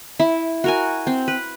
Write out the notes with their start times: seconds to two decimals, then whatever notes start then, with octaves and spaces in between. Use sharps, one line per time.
0.20 E4
0.64 F#4 A#4 G#5
1.07 C4
1.28 B4